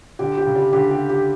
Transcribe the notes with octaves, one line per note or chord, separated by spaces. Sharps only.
D3 G4
G4
C#3
G3
D3 G4
G4
G4